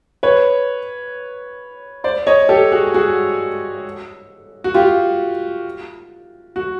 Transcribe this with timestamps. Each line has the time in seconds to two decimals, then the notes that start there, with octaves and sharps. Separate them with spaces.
0.23 B4 C#5
2.04 C5 D5
2.27 C#5 D#5
2.49 G4 A4
2.72 F#4 G#4
2.94 F#4 G#4
4.64 F#4
4.74 F4 G4
6.56 F#4